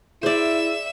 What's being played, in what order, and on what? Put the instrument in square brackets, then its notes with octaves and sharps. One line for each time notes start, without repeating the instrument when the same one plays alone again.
[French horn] E4 [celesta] G#4 E6 [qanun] C5 D5 [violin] E5 E7